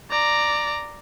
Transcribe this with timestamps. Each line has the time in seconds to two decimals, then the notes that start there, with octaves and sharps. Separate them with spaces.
0.10 D5 A#5